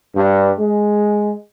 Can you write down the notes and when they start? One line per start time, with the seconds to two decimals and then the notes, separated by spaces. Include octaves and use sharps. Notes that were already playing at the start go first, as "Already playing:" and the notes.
0.14 G2
0.58 G#3